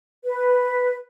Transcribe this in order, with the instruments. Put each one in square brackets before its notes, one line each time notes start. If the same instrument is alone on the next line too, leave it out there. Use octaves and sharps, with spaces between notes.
[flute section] B4